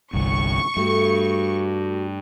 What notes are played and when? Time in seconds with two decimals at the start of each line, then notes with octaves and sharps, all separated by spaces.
0.13 G1 C2 G2 C#6
0.77 G2 A3 F#4